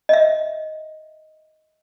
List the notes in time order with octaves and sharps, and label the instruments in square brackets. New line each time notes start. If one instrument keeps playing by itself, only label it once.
[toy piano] D#5 E5